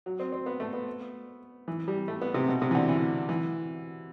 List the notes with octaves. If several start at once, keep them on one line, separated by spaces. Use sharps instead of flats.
F#3
C4
C4
B3
A3
B3
E3
G3
A3
B3
C3
B2
C3
E3
D3
E3
E3